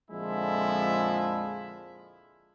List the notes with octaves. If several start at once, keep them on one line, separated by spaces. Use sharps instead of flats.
F2 A#2 D3 F3 G#3 E4